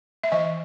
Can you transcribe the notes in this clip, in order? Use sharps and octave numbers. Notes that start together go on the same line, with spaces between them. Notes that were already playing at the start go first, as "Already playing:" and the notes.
E5
E3 D#5